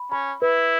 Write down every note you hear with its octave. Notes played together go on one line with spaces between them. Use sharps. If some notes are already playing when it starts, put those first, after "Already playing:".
Already playing: B5
C#4 B5
E4 B4